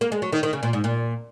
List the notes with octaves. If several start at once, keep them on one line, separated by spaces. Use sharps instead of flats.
A#3
G#3
F#3
D#3
D#3
C#3
A#2
G#2
A#2